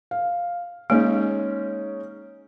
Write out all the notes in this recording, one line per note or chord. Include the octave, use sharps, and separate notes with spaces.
F5
G#3 A#3 C#4 D#4